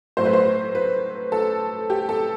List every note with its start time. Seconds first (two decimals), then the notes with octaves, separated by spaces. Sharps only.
0.17 A2 F#3 A3 C5
0.25 B4
0.33 C5
0.75 B4
1.32 A4
1.90 G4
2.09 A4